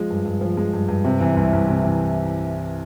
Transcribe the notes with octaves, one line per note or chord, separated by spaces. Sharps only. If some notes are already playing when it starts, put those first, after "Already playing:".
Already playing: F3 G#3
G2
G2
F3
G#3
G2
G2
C3
E3
C2
C2
C3
E3